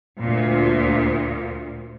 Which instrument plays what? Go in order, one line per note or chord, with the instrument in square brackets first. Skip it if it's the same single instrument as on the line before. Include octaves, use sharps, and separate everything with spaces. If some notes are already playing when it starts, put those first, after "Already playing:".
[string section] D2 A#2